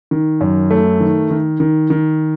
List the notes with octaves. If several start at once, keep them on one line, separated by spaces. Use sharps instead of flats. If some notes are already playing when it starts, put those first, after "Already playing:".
D#3
F#2
A3
D#3
D#3
D#3
D#3